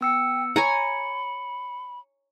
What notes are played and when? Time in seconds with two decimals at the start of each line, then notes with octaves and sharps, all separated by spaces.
0.01 B3 G5 E6 C#7
0.56 C#5 G#5 A#5 B5 C#7